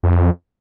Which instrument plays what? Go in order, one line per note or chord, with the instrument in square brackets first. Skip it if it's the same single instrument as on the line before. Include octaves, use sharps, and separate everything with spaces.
[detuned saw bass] F2